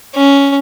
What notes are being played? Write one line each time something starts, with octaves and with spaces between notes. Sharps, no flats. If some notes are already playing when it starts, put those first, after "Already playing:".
C#4